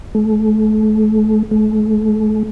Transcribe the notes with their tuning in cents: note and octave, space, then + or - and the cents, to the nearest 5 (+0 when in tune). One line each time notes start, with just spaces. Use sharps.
A3 -35
A3 -40